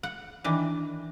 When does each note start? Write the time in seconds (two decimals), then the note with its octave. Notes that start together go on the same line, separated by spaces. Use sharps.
0.03 F#5
0.44 D#3 E3 D4